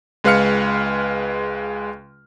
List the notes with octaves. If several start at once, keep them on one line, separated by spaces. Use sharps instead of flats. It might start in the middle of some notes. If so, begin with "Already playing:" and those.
C#2 G#3 B4 F5 F6 C#7